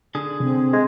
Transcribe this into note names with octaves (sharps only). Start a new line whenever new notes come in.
D3 G#4
C3 C4
G#3